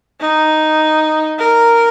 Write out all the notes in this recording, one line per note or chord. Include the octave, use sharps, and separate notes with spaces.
D#4
A#4